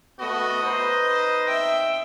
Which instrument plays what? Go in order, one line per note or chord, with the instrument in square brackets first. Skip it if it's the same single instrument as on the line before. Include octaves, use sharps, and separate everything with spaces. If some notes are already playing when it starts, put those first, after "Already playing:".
[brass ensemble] A3 B3 F#4 [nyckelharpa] D#5
[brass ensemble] D#4 B4 C5
[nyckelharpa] E5 G5